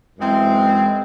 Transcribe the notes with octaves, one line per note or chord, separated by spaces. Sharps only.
F#2 E3 G#3 C4 E4